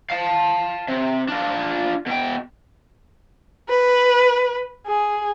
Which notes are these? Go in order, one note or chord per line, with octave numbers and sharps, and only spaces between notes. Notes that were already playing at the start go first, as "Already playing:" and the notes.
F5 A5
C3
D4 F4
B2 G5
B4
G#4